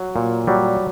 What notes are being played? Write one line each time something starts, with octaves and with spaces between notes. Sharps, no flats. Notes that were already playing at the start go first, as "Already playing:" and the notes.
Already playing: F#3
A#2
F#3 G3